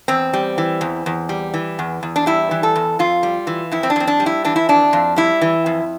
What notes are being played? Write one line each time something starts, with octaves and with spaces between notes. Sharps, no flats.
E2 C4
G3
E3
E2
E2
G3
E3
E2
E2
D4
G3 E4
E3
A4
E2
F2 F4
G3
E3
F2 E4
C4
D4
F2 C4
D4
G3
E4
E3 D4
E4
F2 D4
F2
G3 E4
E3
F2